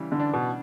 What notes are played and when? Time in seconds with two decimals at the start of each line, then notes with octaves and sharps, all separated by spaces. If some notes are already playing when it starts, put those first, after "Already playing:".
Already playing: C#3 E3 G3
0.12 D3
0.20 D4
0.34 B2